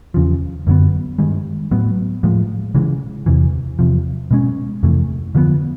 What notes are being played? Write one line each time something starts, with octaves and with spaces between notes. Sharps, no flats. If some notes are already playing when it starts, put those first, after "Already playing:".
E2 C#3 F3
F#2 D3 F#3 B3
G2 D#3 G#3
A2 F#3 B3
A2 F3 G#3
C#3 E3 G#3
E2 C3 E3
E2 C3 F3
B2 G#3 C#4
F2 C3 E3 A3
D3 F3 G#3 B3